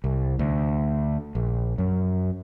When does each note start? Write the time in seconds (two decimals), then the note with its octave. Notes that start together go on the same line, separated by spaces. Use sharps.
0.04 C2
0.39 D2
1.35 A#1
1.78 F#2